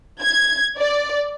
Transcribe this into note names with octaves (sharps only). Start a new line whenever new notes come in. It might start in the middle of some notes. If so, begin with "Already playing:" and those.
G#6
D5